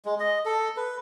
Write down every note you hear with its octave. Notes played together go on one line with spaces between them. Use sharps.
G#3
D#5
A4
B4